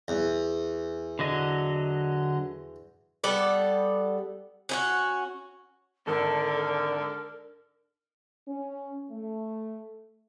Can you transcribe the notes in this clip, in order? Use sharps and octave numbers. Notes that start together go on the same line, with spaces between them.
E2
D3 F#3 D#5
G3 B3 A4 D5
C#4 D#4 F#4
G#1 D3 A4 A#4
C#4
A3